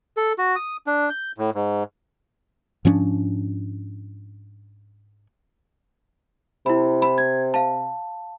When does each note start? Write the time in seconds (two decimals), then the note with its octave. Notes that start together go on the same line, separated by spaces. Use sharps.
0.17 A4
0.38 F#4
0.56 D#6
0.87 D4
1.10 G6
1.38 A2
1.55 G#2
2.85 G#2 F3 C#4 D4
6.66 C3 E4 B5
7.02 B5
7.18 G#6
7.54 F5 A5